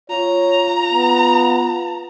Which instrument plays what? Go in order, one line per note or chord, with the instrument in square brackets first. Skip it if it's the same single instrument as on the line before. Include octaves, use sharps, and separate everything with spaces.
[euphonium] F4 [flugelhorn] C#5 [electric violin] A#5
[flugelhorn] B3